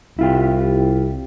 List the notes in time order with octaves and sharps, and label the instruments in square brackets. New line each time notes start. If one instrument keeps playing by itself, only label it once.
[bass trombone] C2 [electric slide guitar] E4 F4 G4